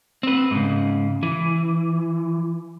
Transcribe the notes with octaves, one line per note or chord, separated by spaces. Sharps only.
C4 B4
G#2 C#3
E3